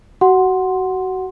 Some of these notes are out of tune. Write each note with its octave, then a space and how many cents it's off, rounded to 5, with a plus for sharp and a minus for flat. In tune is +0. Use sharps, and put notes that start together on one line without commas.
F#4 +25 F#5 +0 C6 +0